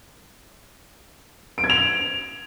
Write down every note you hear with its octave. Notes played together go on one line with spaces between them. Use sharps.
D7
G#6
F7